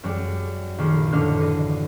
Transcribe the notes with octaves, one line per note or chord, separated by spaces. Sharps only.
F#2 G3 G#3
A#1 D#3 C6
A1 F#2 D3 D4 D#5 F6
C5 D#5